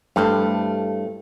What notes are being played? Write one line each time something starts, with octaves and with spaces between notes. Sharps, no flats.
G2 A3 E4 C5